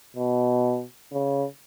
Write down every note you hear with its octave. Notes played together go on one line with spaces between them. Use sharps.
B2
C#3